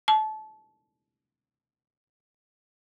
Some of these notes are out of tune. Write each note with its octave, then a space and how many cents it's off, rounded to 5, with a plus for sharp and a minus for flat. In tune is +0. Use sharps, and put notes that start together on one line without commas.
A5 -25